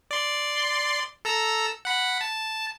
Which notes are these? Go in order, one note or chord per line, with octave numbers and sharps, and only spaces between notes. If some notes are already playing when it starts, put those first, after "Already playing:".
D5 C6
A4 A#5 E6
F#5 B5
A5